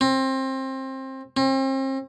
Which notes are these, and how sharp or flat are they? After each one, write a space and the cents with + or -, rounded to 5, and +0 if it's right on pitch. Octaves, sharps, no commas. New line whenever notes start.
C4 +25
C4 +40